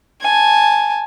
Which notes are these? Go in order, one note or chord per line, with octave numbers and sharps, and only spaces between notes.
G#5 A5